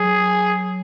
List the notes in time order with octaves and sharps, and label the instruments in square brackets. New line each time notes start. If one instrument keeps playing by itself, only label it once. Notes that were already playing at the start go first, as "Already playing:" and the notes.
Already playing: [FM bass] F#3 [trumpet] G#4